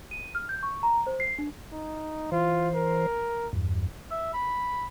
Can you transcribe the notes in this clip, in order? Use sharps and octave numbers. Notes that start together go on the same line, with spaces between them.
D#7
F6
G6
C#6
A#5
C5
C7
D4
D#4
E3 F4 C5
A#4
E2 G2
E5
B5